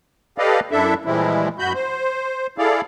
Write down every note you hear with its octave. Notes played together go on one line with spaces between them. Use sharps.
G4 A4 B4 D5 D#5 F5
F#2 D4 E4 A4 E5
A#2 E3 F3 G3 G#3 E4
F#2 F#4 B5 G6
C5
E4 G#4 A4 D5 F5